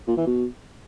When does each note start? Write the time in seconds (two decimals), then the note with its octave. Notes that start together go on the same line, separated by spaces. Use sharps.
0.08 A#2
0.17 E3
0.27 B2